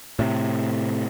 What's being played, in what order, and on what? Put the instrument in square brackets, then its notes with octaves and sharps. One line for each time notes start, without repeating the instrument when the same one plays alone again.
[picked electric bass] A2 C3